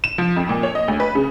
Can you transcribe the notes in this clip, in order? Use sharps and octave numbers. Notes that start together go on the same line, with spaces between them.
E7
F3
F2
A#2
C#5
D#5
D2
B4
C#3